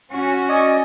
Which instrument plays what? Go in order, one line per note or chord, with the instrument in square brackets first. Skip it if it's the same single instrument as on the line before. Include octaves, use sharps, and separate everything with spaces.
[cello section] C#4 F#4
[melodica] D5 D#5 G#5